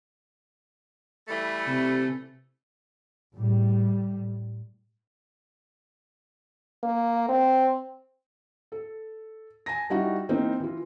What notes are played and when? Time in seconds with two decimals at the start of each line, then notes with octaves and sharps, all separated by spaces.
1.28 E3 G3 A3
1.67 C3
3.35 A2 G3
6.83 A#3
7.29 C4
8.72 A4
9.66 G#5 A5 A#6
9.90 G3 D#4 E4 F#4
10.29 E3 A#3 C4 D#4
10.60 E3 F4